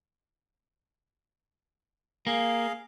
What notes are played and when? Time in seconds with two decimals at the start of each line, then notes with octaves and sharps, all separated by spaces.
2.27 A#3 G#4 F5